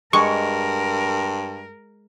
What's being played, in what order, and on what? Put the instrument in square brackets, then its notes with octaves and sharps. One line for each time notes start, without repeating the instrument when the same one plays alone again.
[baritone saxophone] G2 [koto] G#3 [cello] A#4 [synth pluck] C#6